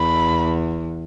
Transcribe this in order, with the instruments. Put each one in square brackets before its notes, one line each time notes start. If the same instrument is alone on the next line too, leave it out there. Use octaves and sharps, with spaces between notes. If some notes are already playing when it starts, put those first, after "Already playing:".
Already playing: [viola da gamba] E2 [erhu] B5